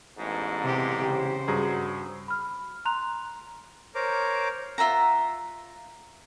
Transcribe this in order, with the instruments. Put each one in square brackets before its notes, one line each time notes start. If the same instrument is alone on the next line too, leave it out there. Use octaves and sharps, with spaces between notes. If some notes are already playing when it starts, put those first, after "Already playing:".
[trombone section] A1 E2 G#2
[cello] C3 G4
[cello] C#3 C5 [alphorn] G4
[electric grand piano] G2 G#4 A#5 [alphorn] F#4
[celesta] B5 F6
A#5 C6 F#6 F7
[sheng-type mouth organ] A#4 C5 C#5 A#5 D6
[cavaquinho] F4 E5 F#5 A#5